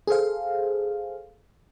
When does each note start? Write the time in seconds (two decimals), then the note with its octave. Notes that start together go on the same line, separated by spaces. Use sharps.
0.07 G#4 A4 C5 F5